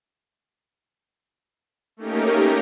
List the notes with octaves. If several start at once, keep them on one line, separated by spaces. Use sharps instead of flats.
A3 A#3 C#4 D#4 G4 A#4